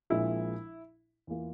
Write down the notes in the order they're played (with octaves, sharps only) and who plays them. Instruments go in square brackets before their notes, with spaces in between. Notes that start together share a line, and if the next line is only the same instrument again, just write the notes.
[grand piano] A#1 A#2 F3 G#3 [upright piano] E4
[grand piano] E2 E3 A#3 F4